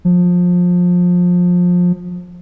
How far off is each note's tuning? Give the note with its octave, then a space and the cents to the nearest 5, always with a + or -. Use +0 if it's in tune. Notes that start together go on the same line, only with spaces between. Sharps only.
F3 +25